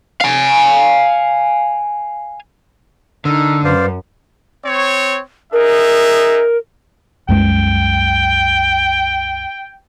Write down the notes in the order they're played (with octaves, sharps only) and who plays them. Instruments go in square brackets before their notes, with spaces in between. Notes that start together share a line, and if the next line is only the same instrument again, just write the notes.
[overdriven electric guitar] F5 G#5
[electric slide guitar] D3 [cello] D#4 [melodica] A#4 [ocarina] E6
[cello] F#2 [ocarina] B4 [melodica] C5 D5 F5
[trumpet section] C4 C#5
[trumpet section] D#4 G#4 E5 [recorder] A#4
[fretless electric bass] C2 F#2 G#3 [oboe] G5